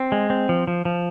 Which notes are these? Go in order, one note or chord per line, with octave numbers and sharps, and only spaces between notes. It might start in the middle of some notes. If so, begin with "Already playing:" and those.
Already playing: C4
G#3
C4
F3
F3
F3